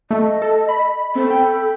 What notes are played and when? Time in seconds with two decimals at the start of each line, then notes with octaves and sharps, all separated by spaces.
0.11 A3 D#5
0.42 A4
0.69 B5
1.15 C4 A4
1.30 G5